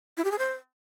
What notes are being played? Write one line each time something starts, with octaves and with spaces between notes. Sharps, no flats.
E4
G4
G#4
C5